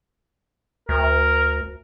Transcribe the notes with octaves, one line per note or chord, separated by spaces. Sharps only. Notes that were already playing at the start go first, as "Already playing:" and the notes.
D2 A#4